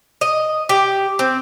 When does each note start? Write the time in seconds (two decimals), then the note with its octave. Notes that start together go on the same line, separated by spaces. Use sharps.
0.21 D#5
0.69 G4
1.19 C4